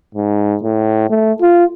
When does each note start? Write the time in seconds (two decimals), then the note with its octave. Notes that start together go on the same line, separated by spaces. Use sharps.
0.15 G#2
0.63 A2
1.10 A3
1.41 F4